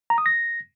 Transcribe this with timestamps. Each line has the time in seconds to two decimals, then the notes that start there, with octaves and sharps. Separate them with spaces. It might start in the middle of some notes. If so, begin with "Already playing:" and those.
0.10 A#5
0.18 D#6
0.26 A#6